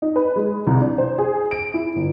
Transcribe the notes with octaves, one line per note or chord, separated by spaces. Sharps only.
D#4
B4
G#3
C2
D4
C5
G#4
D7
E4
G1